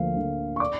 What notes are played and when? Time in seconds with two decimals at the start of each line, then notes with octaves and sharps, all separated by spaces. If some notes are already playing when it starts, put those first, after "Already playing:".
Already playing: D2 D3 F3 A#3 F5
0.17 D3 F3 A#3
0.56 C#6
0.60 D5 D6